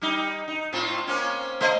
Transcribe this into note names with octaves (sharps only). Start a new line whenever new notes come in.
G3 D#4
D#4
A2 C4 F4
A#3 C4 C#4
A3 C5 D#5